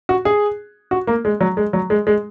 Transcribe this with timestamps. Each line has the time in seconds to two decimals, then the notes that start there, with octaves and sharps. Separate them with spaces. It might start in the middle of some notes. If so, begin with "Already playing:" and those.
0.09 F#4
0.25 G#4
0.91 F#4
1.07 A#3
1.25 G#3
1.41 F#3
1.57 G#3
1.73 F#3
1.90 G#3
2.07 G#3